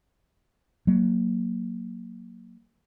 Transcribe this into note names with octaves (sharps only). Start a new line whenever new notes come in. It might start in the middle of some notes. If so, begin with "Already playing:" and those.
F#3 A#3